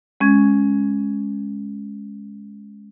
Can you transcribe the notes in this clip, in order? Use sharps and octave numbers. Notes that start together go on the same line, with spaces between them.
G#3 C#4 G#6